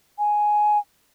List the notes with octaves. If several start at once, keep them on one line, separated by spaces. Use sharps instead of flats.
G#5